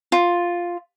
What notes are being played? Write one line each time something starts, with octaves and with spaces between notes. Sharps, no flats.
F4